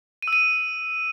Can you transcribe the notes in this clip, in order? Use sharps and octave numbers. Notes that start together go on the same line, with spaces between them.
D#7
E6
D#7